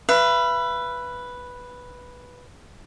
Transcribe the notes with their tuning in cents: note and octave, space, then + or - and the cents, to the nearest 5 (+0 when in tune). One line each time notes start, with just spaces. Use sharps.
B4 +0 E5 +40